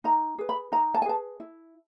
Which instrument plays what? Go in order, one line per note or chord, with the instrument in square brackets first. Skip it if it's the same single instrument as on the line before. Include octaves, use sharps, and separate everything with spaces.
[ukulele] D#4 A#5
G#4 B4
B5
D#4 A#5
A5
G#5
G#4 B4 A5
E4